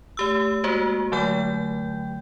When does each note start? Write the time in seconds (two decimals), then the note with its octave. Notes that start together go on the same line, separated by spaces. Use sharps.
0.17 A3 G4 E6
0.64 G#3 A#3 F#4 C5
1.12 D3 F#3 A3 G5 G6